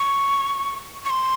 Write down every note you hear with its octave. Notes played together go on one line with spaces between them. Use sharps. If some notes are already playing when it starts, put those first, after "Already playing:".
Already playing: C#6
C#6
C6